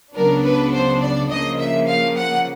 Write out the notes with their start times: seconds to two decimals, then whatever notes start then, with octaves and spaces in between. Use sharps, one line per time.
0.15 C#2 C#3 F#3 B3 D4 A#4
0.45 B4
0.73 C5
1.01 D5
1.30 C#3 F3 A#3 D#5
1.59 E5
1.87 F5
2.16 F#5